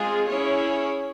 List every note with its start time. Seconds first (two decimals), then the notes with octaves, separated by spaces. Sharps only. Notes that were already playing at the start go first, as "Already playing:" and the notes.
Already playing: G#3 C4 F4 G#4
0.29 C#4 E4 G#4 C#5